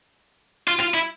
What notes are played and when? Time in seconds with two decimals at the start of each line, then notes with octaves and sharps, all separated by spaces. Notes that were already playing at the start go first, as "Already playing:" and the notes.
0.68 F4
0.80 F4
0.94 E4